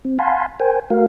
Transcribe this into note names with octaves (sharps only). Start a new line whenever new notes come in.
C4
F5 F#5 G#5 A5 B5 C6
A#4 C5 G5 G#5
A3 F#4 A#4 F5